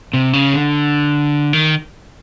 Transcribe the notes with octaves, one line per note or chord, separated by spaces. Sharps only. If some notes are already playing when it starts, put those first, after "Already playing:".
C3
C#3
D3
D#3